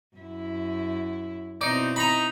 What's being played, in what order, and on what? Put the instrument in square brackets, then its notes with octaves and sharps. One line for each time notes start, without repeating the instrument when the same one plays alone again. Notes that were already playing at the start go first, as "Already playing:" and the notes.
[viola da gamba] F#2 E4
[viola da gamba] B2 C4 E4 [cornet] D#4 [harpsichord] D5
[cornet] D#4 [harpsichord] A#5 B5